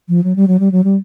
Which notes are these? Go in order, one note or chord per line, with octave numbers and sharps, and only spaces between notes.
F3
F#3
G3
F#3
G3
F#3
G3